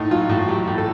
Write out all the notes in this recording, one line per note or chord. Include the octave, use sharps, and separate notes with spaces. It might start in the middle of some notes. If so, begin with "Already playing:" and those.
Already playing: A2 D#4
F#3 F4
A2 F#4
F#3 G4
A2
A4